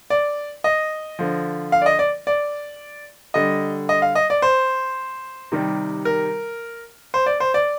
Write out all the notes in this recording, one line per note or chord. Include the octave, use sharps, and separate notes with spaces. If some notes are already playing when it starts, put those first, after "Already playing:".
D5
D#5
D3 F3
F5
D5
D#5
D5
D5
D3 G3 D#5
D#5
F5
D#5
D5
C5
C3 D#3 G3
A#4
C5
D5
C5
D5